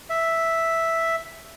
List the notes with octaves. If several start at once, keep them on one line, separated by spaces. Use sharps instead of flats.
E5